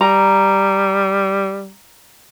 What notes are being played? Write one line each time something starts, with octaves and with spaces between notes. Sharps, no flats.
G3 A#5